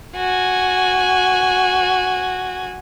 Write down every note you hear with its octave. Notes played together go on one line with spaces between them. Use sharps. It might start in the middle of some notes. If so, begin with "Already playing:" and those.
F#4 G#5